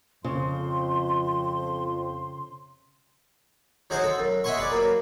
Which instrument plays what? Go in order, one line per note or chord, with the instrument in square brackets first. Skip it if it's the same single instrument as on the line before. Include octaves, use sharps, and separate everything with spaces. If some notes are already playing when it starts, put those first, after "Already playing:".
[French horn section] F2 [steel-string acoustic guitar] C#3 [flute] C6
[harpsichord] F#3 D#4 G#4 C5 F#5
A4
F#2
D#5 E5 F#5 G#5 C6 C#6
G#4 B4 D5
F#3 A#3